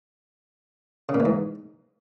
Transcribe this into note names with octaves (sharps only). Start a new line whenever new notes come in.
C#3
A#2
E3
G#2